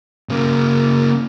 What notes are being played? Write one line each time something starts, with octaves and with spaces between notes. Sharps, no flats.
C#3 A#3